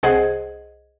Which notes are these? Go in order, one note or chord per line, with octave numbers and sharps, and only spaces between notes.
C2 G#4 C5 D#5 F#5 G#6